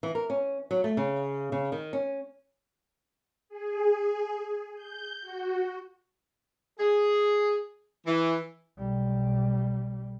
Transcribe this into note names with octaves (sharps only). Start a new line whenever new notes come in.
E3
A#4
C#4
F#3
A3
C#3
C#3
D#3
C#4
G#4
G6
F#4
G#4
E3
B1 G3